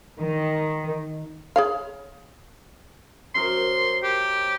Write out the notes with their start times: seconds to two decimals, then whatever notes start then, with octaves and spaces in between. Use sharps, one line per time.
0.21 D#3
1.56 G#4 C#5 F5
3.35 F#2 A#4 C5 C6
4.03 G4